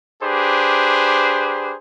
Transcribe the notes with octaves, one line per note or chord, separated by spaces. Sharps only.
D4 G4 G#4 B4 C5